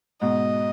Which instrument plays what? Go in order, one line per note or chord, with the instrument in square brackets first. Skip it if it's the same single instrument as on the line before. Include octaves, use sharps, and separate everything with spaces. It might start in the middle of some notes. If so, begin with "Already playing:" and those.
[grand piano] G#2 B2 [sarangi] D#5